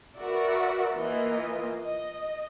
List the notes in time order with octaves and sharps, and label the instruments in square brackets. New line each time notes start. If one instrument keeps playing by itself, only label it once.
[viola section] F#4 A#4 B4 D5 E5
E3 A#3 F4 D#5
D#5